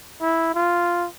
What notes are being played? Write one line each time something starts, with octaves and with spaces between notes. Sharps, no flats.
E4
F4